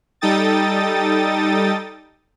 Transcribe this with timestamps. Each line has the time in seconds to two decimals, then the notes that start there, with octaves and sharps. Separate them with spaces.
0.21 G3 D#4 A4 G5 D#6 A6